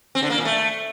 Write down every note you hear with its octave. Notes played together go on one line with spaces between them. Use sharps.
C4
D3
A#3
A#2
A3